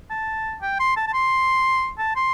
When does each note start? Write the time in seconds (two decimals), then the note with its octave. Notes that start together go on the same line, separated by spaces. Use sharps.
0.10 A5
0.61 G5
0.80 C6
0.96 A5
1.07 A5
1.13 C6
1.98 A5
2.16 C6